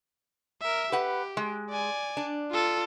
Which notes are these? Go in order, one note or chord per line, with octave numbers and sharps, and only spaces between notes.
A#4 E5
G4 B4 F#5
G#3
D5 G#5
D4
F4 A4